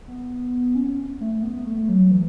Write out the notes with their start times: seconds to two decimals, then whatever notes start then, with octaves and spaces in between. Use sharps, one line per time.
0.08 B3
0.75 C#4
1.20 A3
1.35 A3
1.43 B3
1.66 A3
1.89 F#3
2.11 E3